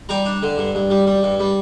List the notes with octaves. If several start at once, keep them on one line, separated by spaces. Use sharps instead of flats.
G3 G5 A#5
D4
D3
G2
G2
G3
G3
G2
G3